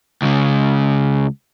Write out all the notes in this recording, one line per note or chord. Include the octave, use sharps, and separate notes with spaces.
C#2 C#3